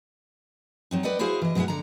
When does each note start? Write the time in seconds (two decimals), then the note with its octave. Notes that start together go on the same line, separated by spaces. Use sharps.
0.91 F#3 C4 D#4
1.03 B4 D5 D#5 F#5 G5
1.19 E4 F#4 G#4 C5 F5
1.42 E3 D#5
1.55 B2 F#3 G#3 E4 F#5
1.68 D3 A#5